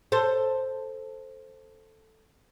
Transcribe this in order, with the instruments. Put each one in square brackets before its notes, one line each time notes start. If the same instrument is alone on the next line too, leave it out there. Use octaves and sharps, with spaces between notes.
[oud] A4 C5